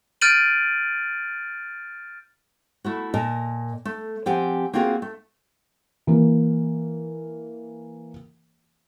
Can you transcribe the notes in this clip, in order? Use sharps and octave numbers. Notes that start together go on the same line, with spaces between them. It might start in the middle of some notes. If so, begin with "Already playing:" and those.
F6 G6 A6 D7 D#7 F#7
A3 E4 F#4
A#2 A#4 D#5 A5
A3
F3 C4 G4 F#5 G#5
A#3 C4 F4 F#4 G#4
A3
E3 A#3